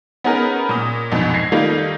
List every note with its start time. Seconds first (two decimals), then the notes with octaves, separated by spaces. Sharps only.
0.24 B3 C#4 D#4 G#4 A#4 B4
0.69 A#2 D#6
1.12 A#1 F2 G#2 B2
1.34 G#6 A#6 C7
1.52 D#3 G3 A3 A#3 D#4 F4